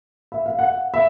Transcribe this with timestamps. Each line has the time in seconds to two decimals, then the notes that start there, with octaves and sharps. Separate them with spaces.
0.32 E5
0.46 F5
0.59 F#5
0.94 E5